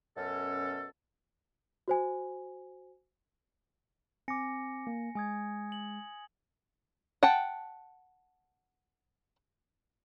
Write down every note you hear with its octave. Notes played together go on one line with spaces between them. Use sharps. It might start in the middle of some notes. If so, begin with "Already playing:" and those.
F#2 B2 C#4 A4
F#4 C5 G#5
C4 G#5 D6 A#6 C#7
A#3
G#3 G#5 D#6 G#6
F#7
F#5 G5 A5